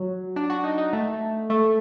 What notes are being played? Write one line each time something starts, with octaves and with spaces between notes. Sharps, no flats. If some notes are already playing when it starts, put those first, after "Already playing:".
Already playing: F#3
D4
F#4
D#4
D#4
A3
A3